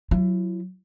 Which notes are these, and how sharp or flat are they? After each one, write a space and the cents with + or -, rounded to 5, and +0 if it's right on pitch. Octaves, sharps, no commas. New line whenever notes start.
F#3 -10 E4 +30